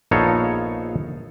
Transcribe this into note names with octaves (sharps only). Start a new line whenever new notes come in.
A#1 B3 D#4 A4 C#5 F5